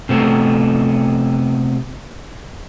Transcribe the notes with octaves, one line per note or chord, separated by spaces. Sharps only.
C3 A3 B3